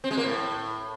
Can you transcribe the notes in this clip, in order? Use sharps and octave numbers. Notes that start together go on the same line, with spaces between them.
C4
G#3
A#3
A2